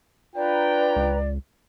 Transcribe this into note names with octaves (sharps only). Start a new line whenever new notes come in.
D4 F4 B4 D5 G5 A#5
C#2